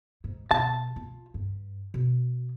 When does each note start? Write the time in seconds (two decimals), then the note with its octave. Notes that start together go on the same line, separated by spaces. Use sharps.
0.24 G#2
0.51 B2 A5
0.96 F4
1.34 G2
1.94 B2